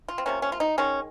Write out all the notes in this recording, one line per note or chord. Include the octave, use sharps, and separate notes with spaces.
F4
C4
C3 F3 A#3 C#4
C#4
F4
D#4
D#3 G#3 C#4